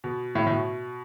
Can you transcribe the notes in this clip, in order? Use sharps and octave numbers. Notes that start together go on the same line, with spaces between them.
B2
A2
A2
B2